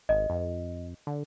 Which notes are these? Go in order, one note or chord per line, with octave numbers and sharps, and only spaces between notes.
G#1 D#5
F2
D3